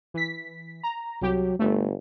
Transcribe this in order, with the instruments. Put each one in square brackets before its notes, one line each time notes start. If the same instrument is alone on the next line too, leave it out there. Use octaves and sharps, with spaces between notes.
[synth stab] E3 B6
A#5
[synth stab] C2 G4 [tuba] F#3
[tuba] G1 [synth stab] A3